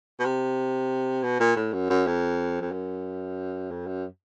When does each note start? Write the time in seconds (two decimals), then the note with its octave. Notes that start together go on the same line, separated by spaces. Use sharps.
0.20 B2
0.25 C3
1.23 B2
1.40 A#2
1.56 A2
1.73 F#2
1.90 F#2
2.07 F2
2.61 F2
2.72 F#2
3.71 F2
3.87 F#2